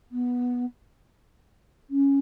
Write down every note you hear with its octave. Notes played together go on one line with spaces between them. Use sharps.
B3
C#4